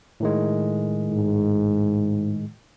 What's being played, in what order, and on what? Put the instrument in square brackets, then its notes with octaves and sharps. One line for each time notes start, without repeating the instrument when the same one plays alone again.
[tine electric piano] A2 D#3 G#3
[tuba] G#2